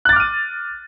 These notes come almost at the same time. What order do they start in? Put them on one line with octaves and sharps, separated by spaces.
F#6 A6 D6 F6 D#7